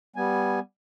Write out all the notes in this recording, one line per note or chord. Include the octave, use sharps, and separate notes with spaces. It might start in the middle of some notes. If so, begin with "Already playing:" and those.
G3 B3 G#5